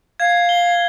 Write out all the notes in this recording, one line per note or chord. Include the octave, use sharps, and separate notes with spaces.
F5 G#6
G7